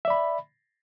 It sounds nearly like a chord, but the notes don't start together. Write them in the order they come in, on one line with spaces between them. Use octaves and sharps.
E5 D5 B5